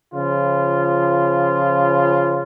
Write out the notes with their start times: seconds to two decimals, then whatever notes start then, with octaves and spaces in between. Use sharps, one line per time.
0.13 C#3 F3 F4